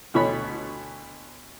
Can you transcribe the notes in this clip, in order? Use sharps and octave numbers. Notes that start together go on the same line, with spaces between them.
D2 B2 C#5 B5